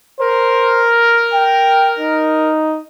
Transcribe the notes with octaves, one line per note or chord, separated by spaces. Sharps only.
A#4 C5
G5
D#4